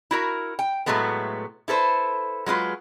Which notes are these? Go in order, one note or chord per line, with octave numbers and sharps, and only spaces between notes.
E4 F#4 A#4
G5
A2 D#3 F#3 G#3 A3 B3
E4 A4 B4 C5
F#3 G#3 F4 B4